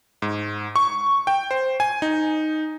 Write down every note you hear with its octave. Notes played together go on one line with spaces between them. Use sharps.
G#2
C#6
G5
C5
G#5
D#4